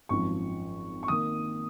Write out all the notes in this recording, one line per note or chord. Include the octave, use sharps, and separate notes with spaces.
G#1 F#2 F3 C#6
C#6
D#3 A#3 D#6